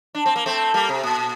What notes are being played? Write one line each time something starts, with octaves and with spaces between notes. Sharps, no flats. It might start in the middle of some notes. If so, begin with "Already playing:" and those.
D4
C4
A#3
A3 C4
G3 A#3
C3
A#2